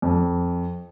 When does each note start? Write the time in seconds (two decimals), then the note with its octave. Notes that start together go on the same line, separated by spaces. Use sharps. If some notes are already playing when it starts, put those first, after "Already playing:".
0.02 F2